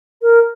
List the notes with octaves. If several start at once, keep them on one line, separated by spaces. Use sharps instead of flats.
A#4